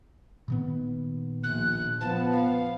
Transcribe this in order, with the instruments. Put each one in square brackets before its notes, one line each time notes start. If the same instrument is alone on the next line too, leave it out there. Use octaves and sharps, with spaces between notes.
[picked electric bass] A#2 D#3 B3
[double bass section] A#1 [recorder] F#6
[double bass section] F3 B3 [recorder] A5
[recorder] F5